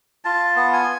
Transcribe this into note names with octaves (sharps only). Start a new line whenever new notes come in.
F4 A5
B3
G#5